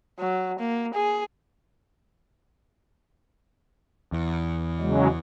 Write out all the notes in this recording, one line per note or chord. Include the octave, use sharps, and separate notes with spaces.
F#3
A#3
G#4
E2
C#3 F#3 G#3